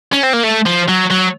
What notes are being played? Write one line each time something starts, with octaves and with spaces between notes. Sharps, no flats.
C#4
C4
A#3
A3
F3
F#3
F#3